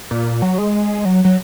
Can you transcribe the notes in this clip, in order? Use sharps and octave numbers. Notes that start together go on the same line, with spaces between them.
A#2
F#3
G#3
F#3
F#3